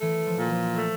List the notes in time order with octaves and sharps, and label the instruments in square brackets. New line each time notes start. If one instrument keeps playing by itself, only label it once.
[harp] E3 [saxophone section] A3
[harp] F3
[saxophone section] A#2
[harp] F3
[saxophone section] A3